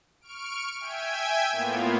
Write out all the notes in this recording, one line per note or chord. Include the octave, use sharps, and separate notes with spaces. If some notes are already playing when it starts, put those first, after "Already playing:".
C#6 F6 D7
E5 G5 G#5 G#6
A2 A#3 B3 F4